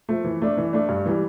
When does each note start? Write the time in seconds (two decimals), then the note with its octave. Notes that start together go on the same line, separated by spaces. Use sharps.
0.09 F3 A3
0.24 E3
0.42 A3 D4
0.57 E3
0.73 A3 D4
0.89 G2
1.06 E3 G3